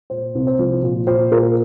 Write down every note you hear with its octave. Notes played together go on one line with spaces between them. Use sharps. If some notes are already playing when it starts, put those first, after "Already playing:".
A#2 C5
C2
C5
F3
A#2
A#2 C5
A#2 A#4